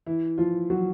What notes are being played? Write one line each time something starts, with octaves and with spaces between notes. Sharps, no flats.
E3 E4
F3 F4
F#3 F#4